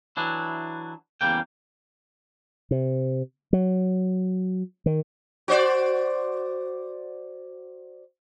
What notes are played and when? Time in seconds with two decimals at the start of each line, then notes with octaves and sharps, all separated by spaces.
0.17 E3 F#3 D4 E4
1.21 E2 C#3 G3 A#3 G5
2.71 C3
3.53 F#3
4.86 D#3
5.48 F#4 C5 D5